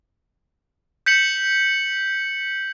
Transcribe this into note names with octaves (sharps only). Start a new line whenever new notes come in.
G6 B6 C#7 F#7